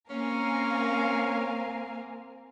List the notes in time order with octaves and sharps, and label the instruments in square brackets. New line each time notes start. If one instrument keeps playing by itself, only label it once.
[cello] A#3 C4 [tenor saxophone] C#4 [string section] A#4 F5 G#5